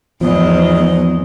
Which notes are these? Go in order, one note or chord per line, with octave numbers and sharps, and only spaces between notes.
E2 G#2 F3 B3 D#5